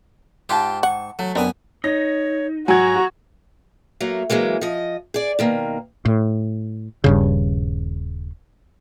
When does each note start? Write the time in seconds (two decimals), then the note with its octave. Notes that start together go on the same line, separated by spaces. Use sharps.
0.49 G#2 F4 G4 G5 A5
0.83 F#5 C#6
1.19 F#3 A3
1.35 F#2 B3 C4 D4 A#4 G#5
1.84 D#4 C#5 A#6
2.68 G#2 F#3 F#4 F#5 G#5 A#5 G#6
4.01 F#3 A3 A#3
4.30 E3 F#3 G#3 A#3
4.61 F3 D#5
5.14 G#4 D5
5.39 B2 D#3 A#3
6.05 A2
7.04 D#1 G2 C#3